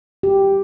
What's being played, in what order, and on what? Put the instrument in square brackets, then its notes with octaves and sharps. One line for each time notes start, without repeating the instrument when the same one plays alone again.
[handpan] G4